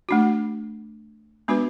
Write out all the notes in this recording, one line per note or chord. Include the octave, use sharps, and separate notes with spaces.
A3 D4 F#4
G#3 B3 D4 F#4 B4